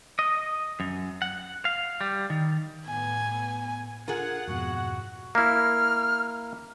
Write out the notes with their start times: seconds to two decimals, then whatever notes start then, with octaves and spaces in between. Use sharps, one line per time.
0.19 D#5
0.80 F#2
1.22 F#5
1.65 F5
2.01 G3
2.30 D#3
2.86 A2 B3 G#5
4.08 F4 G#4 A#4 F#5
4.47 F2 G#2 B2 F#4
5.35 A#3 E4 F6